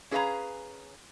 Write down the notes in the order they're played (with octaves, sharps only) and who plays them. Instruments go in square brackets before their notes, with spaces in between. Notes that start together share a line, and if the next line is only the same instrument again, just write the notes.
[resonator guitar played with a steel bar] C#4 G#4 B4 D#5 F5 A#5